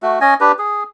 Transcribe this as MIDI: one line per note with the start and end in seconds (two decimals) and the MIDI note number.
0.03 0.19 57
0.03 0.19 66
0.21 0.34 61
0.21 0.34 75
0.21 0.34 80
0.41 0.52 62
0.41 0.52 67
0.41 0.52 71
0.59 0.83 68